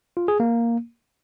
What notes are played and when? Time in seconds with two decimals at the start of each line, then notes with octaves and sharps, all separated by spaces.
0.17 F4
0.28 G#4
0.40 A#3